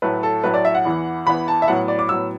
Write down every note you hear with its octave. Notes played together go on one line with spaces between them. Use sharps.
A2 F#3 A3 B4
A4
A2 F#3 A3 B4
D5
E5
F#5
E2 E3 B3
E2 E3 B3 B5
A5
E5
A2 F#3 B3 F#5
D5
D6
A2 F#3 B3 E6